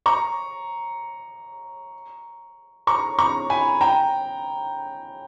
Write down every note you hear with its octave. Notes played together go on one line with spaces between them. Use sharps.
A#5 C#6
A#5 C#6
A#5 C#6
G#5 B5
G5 A#5